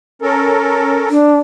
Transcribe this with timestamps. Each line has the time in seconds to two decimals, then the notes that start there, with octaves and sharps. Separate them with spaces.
0.22 C#4 A4 A#4
1.10 D4